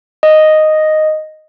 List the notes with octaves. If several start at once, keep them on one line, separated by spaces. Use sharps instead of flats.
D#5